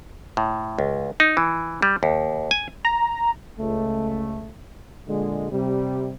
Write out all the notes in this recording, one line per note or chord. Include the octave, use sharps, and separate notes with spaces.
A2
C#2
D#4
E3
G3
D#2
G#5
A#5
C#2 A3
A#2 D3 G#3
C3 G3